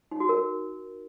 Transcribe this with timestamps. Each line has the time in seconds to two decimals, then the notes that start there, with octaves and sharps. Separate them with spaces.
0.11 D#4
0.20 F#4
0.29 A#4